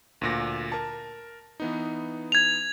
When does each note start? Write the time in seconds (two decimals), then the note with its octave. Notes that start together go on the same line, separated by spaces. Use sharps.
0.21 D2 A#2 A#6
0.72 A#4 A5
1.60 E3 B3 D#4
2.32 G#6 F7